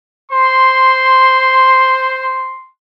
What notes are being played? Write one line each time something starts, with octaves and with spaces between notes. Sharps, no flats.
C5 C6